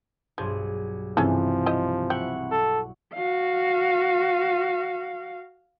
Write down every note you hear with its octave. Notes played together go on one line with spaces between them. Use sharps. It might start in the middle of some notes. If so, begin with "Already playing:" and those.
B1 G2 F3 G#4
G2 C3 E3 F3 C#4 G#4 A4
E4 G4 D#5
E4 F#5 G5 C#6
A4
F#4 F5